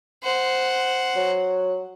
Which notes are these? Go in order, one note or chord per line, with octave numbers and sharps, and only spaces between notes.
C5 F#5
F#3